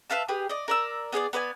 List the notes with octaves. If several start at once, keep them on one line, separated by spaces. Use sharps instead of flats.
B4 E5 F5 A5
G4 G#4 B4
D5 D#5
A#4 D5 E6
B3 G#4 C#5 D5
B3 B4 D5 G#5